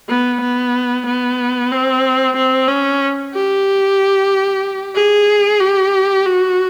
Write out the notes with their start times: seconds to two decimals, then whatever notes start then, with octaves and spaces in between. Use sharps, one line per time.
0.09 B3
0.41 B3
1.06 B3
1.72 C4
2.36 C4
2.68 C#4
3.34 G4
4.95 G#4
5.60 G4
6.26 F#4